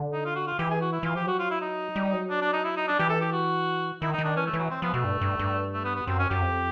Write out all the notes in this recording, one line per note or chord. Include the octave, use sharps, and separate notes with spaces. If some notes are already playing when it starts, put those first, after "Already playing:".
Already playing: D3
D#4
F4
F#4
F4
E3 G4
G#4
F#4
E4
E3 F4
F3 G4
F#3 F#4
F4
E4
D#4
G3
F#3
D4
D4
D#4
E4
D#4
D4
E3 G4
A4
G4
F#4
D#3 E4
D#4
D#3
D4
E3 C#4
A3
E3
F#3
C4
F3 B3
B2 A3
G2
G2
G2
A3
B3
B3
F#2 C4
C#4
F#2 G4
F2